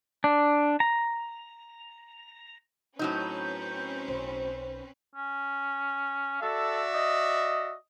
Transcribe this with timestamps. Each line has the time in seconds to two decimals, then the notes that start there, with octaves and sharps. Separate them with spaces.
0.24 D4
0.80 A#5
2.99 A2 F#3 C4 C#4 D#4 B4 G6
4.08 B1 C5
5.15 C#4
6.42 F#4 A4 D5 E5
6.94 D#5